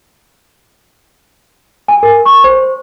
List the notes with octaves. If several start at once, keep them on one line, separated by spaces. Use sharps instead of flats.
G#5
A#4
C#6
C5